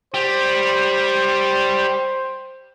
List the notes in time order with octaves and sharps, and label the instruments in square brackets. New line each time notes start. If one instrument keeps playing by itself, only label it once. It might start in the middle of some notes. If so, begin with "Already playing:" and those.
[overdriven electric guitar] G3 [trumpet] C5